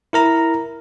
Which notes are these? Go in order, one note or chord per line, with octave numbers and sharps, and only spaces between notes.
E4 A#4 A#5